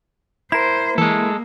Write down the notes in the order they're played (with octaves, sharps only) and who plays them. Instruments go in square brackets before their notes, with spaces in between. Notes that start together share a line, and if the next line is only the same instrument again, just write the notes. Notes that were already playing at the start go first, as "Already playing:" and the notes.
[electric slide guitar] E4 A#4 [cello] C5 [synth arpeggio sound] E7
[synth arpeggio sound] E3 [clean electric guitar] G#3 A4 [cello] A#3